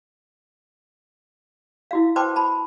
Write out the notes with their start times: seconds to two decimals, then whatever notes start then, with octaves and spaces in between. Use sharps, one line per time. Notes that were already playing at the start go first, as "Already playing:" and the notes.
1.91 E4 F#4 F5
2.16 B4 C5 G5 A5 C6 D6
2.36 A5 B5